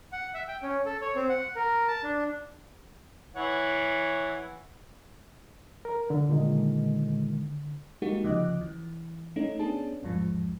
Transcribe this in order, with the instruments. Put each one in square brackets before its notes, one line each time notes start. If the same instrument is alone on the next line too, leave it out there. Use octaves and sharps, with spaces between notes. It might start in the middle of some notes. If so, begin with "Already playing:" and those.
[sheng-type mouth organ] F#5
E5
G5
C#4
A4
C#5
C4
F#5
A#4
A5
D4
[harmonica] E3 C#5 F#5
[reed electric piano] A#4
D3
[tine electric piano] A#2 D#3 G#3
[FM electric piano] G#3 A#3 D#4 F#4 G4
D2 C#3 F3 D#5 D6 F#6
E3
A3 C#4 D#4
B3 C#4 D4 G#4 A5
A1 E2 G#2 F3 G#3